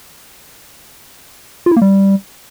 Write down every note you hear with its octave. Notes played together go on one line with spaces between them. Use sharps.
F4
E4
A#3
G3